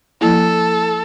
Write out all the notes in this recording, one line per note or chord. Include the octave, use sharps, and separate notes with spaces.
F3 A#3 E4 A4